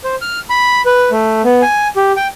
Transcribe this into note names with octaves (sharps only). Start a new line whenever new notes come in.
C5
F6
B5
B4
A3
B3
G#5
G4
G5